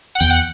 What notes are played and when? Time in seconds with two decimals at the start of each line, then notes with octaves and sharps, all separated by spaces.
0.15 F#5
0.20 E2 G5
0.30 F#5